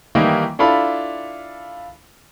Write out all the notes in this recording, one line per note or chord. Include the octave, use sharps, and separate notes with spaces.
D#3 E3 G3 A#3 D#4 E4
D4 E4 F4 A4 F5 B5